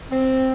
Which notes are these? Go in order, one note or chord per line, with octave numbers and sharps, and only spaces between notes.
C4